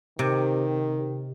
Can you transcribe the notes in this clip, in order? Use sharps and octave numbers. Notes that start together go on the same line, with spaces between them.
C3 D#3